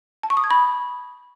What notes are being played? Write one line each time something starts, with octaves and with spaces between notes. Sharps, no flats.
A5
C#6
D#6
G#6
B5